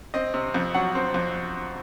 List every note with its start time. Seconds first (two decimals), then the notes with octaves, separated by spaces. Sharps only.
0.14 C4 D#5
0.34 C3
0.54 F2
0.74 F#3 F#5
0.95 C4
1.14 F2